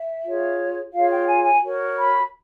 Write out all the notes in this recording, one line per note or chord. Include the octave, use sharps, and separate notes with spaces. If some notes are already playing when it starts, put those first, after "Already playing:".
Already playing: E5
F4 G#4 C#5
F4 G#4 C#5 F5
G5
G#5
G#5
F#4 A#4 C#5
B5